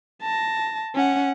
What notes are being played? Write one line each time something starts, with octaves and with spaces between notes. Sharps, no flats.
A5 A#6
C#4 F#5